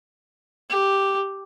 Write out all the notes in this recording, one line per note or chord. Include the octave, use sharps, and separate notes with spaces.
G4